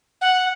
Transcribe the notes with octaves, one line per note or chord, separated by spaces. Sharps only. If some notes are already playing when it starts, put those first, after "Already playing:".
F#5